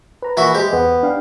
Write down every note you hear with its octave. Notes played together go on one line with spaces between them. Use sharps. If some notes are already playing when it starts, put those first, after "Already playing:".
B4 A#5
A#2 E3 F#4 E5
G#3 G4 C5
E2 B3
D4 F5 G5